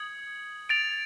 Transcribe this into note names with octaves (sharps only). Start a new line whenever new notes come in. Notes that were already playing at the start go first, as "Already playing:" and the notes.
Already playing: D#6 G#6 C#7 F#7
A6 D7 F7